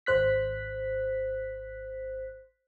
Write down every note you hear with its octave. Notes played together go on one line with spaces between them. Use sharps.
G#1 C5 F#6 B6